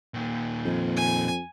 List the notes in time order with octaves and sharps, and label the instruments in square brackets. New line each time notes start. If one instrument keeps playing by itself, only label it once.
[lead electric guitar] A#2 D#3
[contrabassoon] F2
[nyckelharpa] G#5